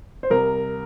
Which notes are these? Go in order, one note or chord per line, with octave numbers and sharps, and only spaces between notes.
C5
C2 A#4